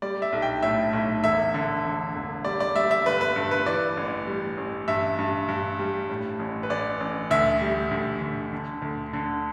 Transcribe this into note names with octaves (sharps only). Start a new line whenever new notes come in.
G3 D5
E5
B1
G5
A2 E5
B1
E1 E5
D3
E1
E1
G3 D5
D5
G3 E5
E5
G1 B4
B4
G2
B4
E3 D5
A1
G3
A1
G2 E5
G2
G2
G3
A2
A1
B4
A1 D5
A1
D2 E5
G3
D2
D2
D3
D2
D3